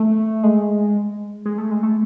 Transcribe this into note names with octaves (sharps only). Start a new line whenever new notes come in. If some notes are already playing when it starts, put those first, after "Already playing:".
Already playing: A3
G#3
G#3
A3
G#3
A3